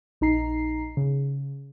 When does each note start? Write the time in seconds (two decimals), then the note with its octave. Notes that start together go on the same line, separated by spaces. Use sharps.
0.21 A#1 D#4 A#5 C7
0.97 C#3